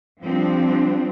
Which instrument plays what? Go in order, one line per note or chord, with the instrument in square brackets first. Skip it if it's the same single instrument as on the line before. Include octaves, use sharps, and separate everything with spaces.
[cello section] F3 G3 C4 D4